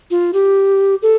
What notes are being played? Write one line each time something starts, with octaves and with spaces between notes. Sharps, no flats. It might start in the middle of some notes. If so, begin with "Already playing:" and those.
F4
G4
A4